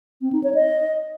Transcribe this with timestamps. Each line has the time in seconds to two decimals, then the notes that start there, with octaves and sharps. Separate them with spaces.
0.22 C4
0.33 D#4
0.44 C#5
0.55 D#5